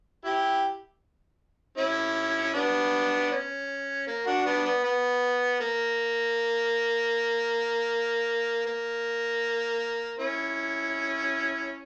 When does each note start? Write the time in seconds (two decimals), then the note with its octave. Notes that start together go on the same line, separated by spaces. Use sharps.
0.25 E4 G4
1.78 C#4 E4
2.54 B3 D4
3.31 C#4
4.07 A#3
4.26 D4 F#4
4.45 B3 D4
4.65 B3
4.84 B3
5.60 A#3
8.66 A#3
10.19 C#4 E4